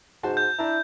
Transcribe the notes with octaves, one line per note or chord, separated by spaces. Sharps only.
G#2 F#4 C5 A5
G6
D4 E4 A5 A#5